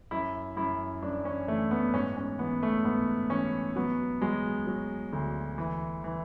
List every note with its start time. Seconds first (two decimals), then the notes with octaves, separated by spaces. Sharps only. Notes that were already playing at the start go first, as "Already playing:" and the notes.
0.11 F#2 E4
0.57 F#2 E4
1.02 F#2 D4
1.25 C#4
1.48 E3 A3
1.71 B3
1.94 G#2 C#4
2.17 C#4
2.39 E3 B3
2.63 A3
2.84 G#2 B3
3.30 E3 C#4
3.76 F#3 B3
4.21 F#3 G#3
4.67 F#3
5.13 D2
5.58 E3
6.04 E3